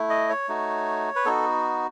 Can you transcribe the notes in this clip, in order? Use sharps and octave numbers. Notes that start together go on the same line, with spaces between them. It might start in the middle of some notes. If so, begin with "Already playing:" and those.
Already playing: A3 E4
D#5
C#5
A3 D#4 F#4
B4
B3 D#4 F#4 A4